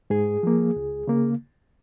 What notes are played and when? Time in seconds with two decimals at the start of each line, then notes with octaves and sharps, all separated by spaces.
0.10 G#2 G#4
0.43 F3 A#3
0.76 C#2
1.07 C#3 A#3